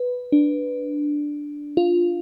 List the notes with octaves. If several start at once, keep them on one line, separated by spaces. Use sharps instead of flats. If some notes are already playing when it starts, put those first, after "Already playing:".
Already playing: B4
D4
F4